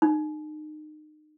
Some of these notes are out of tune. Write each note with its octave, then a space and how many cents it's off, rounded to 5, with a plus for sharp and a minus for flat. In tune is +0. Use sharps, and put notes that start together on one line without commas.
D#4 -30